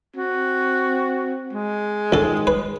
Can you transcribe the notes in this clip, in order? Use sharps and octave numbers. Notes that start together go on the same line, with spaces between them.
C4 F#4
G#3
C#2 D#3 A4
B4